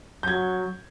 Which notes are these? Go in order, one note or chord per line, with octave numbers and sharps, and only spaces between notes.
F#3 G6 G#6